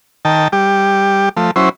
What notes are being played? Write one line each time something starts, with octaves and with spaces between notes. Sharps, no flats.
D#3 G5 A5
G3 G4
F3 A3
F#3 C#4 E4 C5